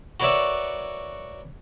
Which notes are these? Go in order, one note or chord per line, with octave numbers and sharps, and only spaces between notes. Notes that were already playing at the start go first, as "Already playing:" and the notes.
F#4 A#4 B4 C#5 D5 E5